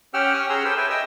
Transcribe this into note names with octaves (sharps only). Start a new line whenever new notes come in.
C#4 G4 F#5 G5 E6 F6
C#6 D#6
C#4 G#4 F#5 A#5 C6 E6
G4 A4 B4 C5 G5 E6
B4 E5 G5 G#5
D#5 E5 G5 D#6 E6